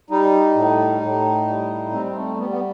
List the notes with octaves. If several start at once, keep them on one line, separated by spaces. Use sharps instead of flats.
G3 D#4
A2
A2
G3
G3 C4
A3
G3 B3
B3